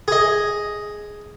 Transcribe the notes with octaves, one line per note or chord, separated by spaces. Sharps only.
G#4 D#5